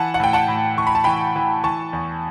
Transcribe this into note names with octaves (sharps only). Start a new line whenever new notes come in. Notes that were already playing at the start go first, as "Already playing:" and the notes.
Already playing: E3 F#5 A5
F#5
A2 G5
F#5 A5
A2
E3 C#6
B5
A5
E3 G5 B5
E3
E3 A5 C#6
E2